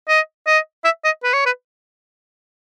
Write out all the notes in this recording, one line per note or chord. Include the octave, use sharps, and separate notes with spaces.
D#5
D#5
E5
D#5
B4
C#5
B4